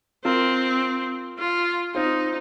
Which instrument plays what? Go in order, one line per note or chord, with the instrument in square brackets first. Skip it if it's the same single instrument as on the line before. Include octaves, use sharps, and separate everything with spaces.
[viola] C4 [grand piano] F4 A#4
[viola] F4
[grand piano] C4 F4 [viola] D#4